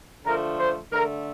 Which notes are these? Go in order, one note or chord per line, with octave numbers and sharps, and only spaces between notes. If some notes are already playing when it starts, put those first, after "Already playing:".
D3 F3 A3 A#4
C5
D3 A3 A#4